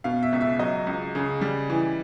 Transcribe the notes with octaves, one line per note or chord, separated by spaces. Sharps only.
B2 F5
E5
C#2
E5
F#3 D#5
C#2
C#3
G3
E3